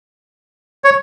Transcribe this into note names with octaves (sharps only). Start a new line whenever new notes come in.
C#5